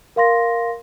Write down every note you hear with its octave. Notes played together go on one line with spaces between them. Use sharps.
A#4 F5 C6 A#6